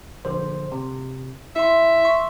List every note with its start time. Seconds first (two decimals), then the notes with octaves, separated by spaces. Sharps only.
0.25 A#1 D3 C5
0.72 C3
1.56 E4 E5 C6
2.05 C6 C#6